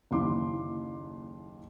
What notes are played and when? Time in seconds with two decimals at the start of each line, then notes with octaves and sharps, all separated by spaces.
0.11 F#1 D#2 E4 F5 C6 D6